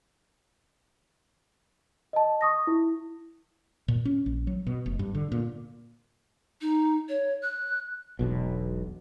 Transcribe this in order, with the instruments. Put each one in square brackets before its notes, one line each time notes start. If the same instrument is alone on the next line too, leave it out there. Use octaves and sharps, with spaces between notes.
[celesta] D#5 A5
C#6 D#6 A#6
E4
[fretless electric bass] A#2
C#4
A#1
F#3
B2
F1
G2
D3
A#2
[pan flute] D#4
C#5
F#6
[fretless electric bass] E1 B1 B2